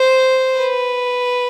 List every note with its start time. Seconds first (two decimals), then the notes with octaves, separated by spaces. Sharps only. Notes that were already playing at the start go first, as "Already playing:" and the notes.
Already playing: C5
0.57 B4